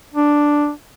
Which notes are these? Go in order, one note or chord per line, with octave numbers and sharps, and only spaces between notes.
D4